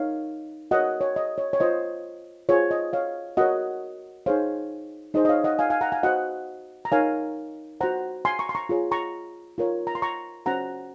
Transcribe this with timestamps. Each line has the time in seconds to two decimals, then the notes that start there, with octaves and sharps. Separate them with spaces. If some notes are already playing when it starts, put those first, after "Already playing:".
Already playing: D#4 A#4 C#5 F5
0.71 F#4 A#4 C#5 D#5 F#5
1.01 C#5
1.16 D#5
1.38 C#5
1.53 C#5
1.60 F4 C5 D#5
2.49 F4 G#4 C5 C#5
2.71 D#5
2.93 C#5 F5
3.37 F#4 A#4 C#5 D#5 F#5
4.26 D#4 G#4 C5 C#5 F5
5.14 D#4 G#4 C5 D#5
5.25 D#5
5.29 C#5 F5
5.44 D#5 F#5
5.59 F5 G#5
5.70 F5 G#5
5.81 F#5 A#5
5.92 F5 G#5
6.03 F#4 C5 D#5 F#5
6.85 A#5
6.92 D#4 A#4 C#5 F5 G#5
7.81 F#4 C5 F#5 A#5
8.25 G#5 C6
8.39 A#5 C#6
8.49 C6
8.55 A#5 C#6
8.69 F4 G#4 C#5
8.91 A#5 C#6
9.58 F4 A#4 C#5
9.87 A#5
9.95 C6
10.02 A#5 C#6
10.46 C#4 F#4 C5 F#5 A#5